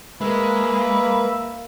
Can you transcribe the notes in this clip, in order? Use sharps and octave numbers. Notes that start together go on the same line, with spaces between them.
G#3 A#3 B4 E5